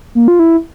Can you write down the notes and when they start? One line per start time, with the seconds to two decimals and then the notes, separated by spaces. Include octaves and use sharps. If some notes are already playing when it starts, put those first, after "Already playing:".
0.15 A#3
0.28 F4
0.39 E4